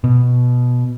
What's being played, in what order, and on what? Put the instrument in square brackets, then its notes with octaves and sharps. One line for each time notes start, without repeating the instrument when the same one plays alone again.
[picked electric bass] B2